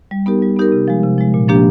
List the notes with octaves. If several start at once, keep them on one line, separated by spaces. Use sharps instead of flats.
G3
B3 D#4 G4 A#4
G3
B3 D#4 G4 A#4
C3
F3 G#3
C3
F3 G#3
A#2
F3 A#3 D4 G4